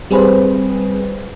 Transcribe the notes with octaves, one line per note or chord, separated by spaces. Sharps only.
G3 C4 G#4 B4 C5